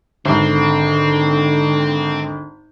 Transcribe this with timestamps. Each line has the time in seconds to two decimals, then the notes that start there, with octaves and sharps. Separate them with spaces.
0.26 G#1 D3 C4